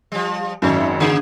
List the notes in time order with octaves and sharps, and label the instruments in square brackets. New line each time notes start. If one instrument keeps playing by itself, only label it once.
[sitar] F3 G3
[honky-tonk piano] G#1 F#2 [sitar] A3
[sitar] C#3 A#3 G#4